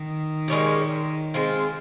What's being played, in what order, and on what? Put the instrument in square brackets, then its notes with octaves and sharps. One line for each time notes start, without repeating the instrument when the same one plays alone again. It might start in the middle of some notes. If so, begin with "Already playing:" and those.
Already playing: [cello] D#3
[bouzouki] A#2 G#3 C#4 G4
G#3 C4 F4